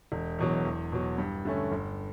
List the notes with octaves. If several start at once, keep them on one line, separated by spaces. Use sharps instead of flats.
E1
E2 B2 F#3
E2
B2 F#3
G2
D3 A3 C#4
G1